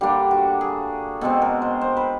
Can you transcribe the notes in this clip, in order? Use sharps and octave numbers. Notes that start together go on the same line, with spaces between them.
D3 G3 A#3 D4 G4
F#4
G#4
B2 G#3 C4 A4
A#4
C5
C5
B4